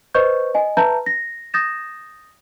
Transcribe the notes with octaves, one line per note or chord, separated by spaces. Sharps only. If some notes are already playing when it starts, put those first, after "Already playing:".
B4 C5 D#5 C#6 G6
D#5 G#5
B4 E5 A5 A#5 G6
A#6
D#6 G6 A6 A#6 E7